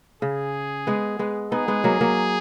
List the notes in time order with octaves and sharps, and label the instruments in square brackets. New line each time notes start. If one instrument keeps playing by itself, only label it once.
[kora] C#3 [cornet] G#4
[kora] G#3 B3
G#3 B3
[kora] B3 D#4 [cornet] G#4
[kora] G#3 B3
F#3 A#3
F#3 A#3